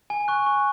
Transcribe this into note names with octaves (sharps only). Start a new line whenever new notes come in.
G#5
C#6 F#6
C#6